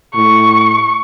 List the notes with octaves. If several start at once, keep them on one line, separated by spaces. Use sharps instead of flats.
A2 C#6